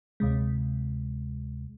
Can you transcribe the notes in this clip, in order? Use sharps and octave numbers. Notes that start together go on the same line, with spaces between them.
D2 C3 G#3